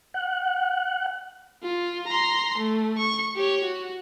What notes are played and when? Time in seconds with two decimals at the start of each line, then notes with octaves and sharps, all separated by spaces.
0.14 F#5
1.63 F4
2.07 A#5 C6
2.58 A3
2.98 C#6
3.36 G4 C#5
3.64 F#4